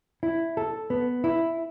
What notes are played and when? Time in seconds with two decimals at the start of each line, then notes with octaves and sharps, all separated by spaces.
0.23 E4
0.57 A4
0.90 B3
1.24 E4